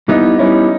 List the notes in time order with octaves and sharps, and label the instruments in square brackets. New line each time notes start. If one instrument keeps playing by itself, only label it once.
[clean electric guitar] G3 B3 E4 [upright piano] D#4
[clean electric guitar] G3 B3 E4 [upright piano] C#4